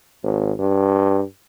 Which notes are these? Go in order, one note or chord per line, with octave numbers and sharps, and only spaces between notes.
G#1
G2